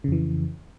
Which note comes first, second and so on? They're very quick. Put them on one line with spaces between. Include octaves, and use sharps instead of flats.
C#3 F2 E3